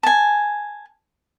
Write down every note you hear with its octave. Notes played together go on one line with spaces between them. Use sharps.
G#5 A5